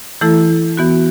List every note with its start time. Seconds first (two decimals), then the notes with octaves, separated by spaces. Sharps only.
0.21 E3 A3 E4 A4
0.77 E3 B3 F#4